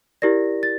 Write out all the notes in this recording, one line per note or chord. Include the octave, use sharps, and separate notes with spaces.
E4 G4 A#4 D5 A#6
A6